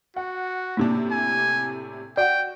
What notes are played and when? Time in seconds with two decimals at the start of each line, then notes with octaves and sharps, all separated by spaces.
0.16 F#4 F#5
0.77 A2 C3 A#3 D4
1.11 G#5
2.17 F#4 D5 F#5 G5